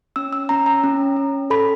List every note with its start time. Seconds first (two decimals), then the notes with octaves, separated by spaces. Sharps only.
0.16 C#4 E6
0.33 E6
0.49 C#4 A#5
0.66 A#5
0.84 C#4
1.16 C#4
1.50 A4 B5